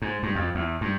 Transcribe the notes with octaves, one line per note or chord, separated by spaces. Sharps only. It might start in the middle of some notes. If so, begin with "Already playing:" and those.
G#2
G2
F2
E2
G2